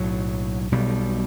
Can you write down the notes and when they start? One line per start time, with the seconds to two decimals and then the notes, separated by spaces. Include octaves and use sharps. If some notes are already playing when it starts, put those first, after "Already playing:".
Already playing: B1 A2 F#3
0.72 B1 B2 G3